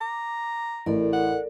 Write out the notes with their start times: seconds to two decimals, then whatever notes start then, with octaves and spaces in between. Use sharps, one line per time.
0.01 A#5 D6
0.86 A1 A2 A4 A#4 D5
1.13 F#5